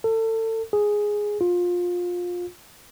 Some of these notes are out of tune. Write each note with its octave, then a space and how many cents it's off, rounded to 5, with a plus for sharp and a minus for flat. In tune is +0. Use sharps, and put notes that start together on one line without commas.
A4 +30
G#4 +0
F4 +20